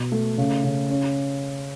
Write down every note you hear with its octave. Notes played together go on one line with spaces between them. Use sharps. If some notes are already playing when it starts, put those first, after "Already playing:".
Already playing: B2
A3
C#3
C#3
C#4